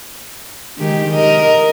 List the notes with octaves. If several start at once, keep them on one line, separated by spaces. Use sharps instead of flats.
D#3 G#3 G4
A#4 D#5